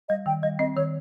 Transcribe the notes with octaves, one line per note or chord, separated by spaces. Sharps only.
G3 D#5
D#3 G5
G3 D#5
C4 D#5
D#3 C#5